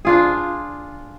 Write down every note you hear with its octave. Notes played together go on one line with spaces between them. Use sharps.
D4 F4 G#4